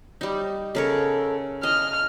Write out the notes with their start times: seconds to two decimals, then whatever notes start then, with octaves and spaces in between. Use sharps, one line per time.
0.21 G3 D#4
0.75 C#3 A4 A#4 C#5
1.63 E4 D#5 F6